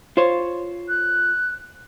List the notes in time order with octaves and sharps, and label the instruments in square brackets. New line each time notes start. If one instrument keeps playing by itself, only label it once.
[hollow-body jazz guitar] F4 C5 C#5
[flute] F#6